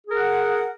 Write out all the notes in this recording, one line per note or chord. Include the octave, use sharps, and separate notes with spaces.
G#4 A#4 F#5